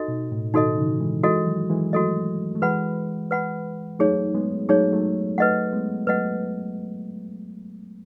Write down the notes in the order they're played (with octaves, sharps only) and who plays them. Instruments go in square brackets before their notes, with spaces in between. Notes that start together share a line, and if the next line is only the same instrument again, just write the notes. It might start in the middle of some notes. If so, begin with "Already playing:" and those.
Already playing: [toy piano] D#4 F#4 A4 D#5
[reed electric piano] B2
A2
[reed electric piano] B2 D#3 [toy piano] D#4 F#4 A4 D#5
[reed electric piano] C#3 E3
E3 G#3
[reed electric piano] E3 G#3 [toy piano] F#4 A4 D#5
[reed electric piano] D#3 F#3
E3 G#3
[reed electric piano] F#3 A3 [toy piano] F#4 A4 D#5
[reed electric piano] A3
[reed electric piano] E3 G#3 [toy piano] B4 F#5 B5
[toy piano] B4 F#5 B5
[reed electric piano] F#3 A3 [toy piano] D#4 G#4 C#5
[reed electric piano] G#3 B3
[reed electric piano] F#3 A3 [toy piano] D#4 G#4 C#5
[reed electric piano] F#3 A3
[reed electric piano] F#3 A3 [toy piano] B4 D#5 F#5
[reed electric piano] G#3 B3
[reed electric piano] F#3 A3 [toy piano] B4 D#5 F#5